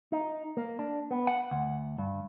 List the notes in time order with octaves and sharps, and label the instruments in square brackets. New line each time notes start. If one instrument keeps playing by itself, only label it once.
[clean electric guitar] D#4
A#3
D4
B3
F#5
D2
G2